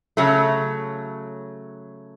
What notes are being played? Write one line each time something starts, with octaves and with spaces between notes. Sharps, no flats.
C#3 F#3 A3